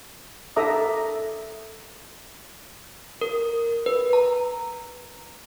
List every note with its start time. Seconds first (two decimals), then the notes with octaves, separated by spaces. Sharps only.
0.56 A4 A#4 E5 A#5 D6 D#6
3.21 A#4
3.86 B4
4.13 A#5